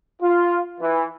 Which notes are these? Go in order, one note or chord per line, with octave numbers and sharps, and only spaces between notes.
F4
E3